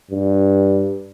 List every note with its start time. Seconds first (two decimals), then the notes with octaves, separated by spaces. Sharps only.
0.11 G2